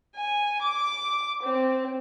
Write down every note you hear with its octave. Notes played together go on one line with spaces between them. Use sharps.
G#5
D6
C4